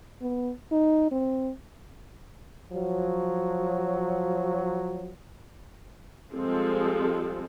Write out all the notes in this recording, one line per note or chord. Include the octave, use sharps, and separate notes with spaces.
B3
D#4
C4
F3 F#3
F3 G3 G#3 C4 A4